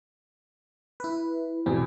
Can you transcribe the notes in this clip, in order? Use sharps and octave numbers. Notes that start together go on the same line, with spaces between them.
E4 B4
E2 B2 C4